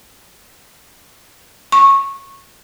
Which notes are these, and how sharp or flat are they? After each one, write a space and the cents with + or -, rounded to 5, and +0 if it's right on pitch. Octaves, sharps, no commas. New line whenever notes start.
C#6 -15